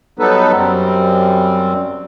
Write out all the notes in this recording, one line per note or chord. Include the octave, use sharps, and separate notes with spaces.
F#3 G3 B3 D#4 A4 B4
F#2 G3 C4